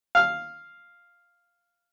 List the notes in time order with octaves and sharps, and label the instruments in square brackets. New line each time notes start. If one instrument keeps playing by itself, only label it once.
[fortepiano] F5 F6